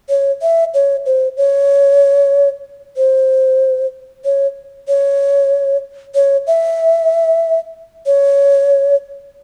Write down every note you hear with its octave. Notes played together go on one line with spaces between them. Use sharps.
C#5
E5
C#5
C5
C#5
C5
C#5
C#5
C#5
E5
C#5